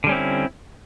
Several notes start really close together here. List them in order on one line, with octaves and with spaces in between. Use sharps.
D3 G3 C#4 C4 E4